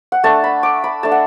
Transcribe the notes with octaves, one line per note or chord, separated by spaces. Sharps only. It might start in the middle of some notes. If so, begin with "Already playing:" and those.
F#5
A3 D4 A5
B5
D6
B5
A3 D4 A5
F#5